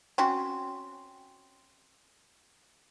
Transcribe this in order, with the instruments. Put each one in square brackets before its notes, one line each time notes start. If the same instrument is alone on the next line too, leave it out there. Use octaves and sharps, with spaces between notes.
[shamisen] C4 C#4 F#4